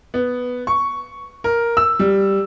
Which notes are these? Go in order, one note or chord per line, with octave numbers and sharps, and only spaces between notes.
B3
C#6
A#4
E6
G3